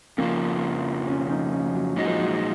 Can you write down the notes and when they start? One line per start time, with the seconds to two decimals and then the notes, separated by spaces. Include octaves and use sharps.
0.18 F2 C#3 F3 A#3
1.07 C#4
1.25 C#4
1.30 D#4
1.52 C#4
1.74 F#3
1.96 A#2 F#3 G#3 D#4
2.07 F3
2.19 F#3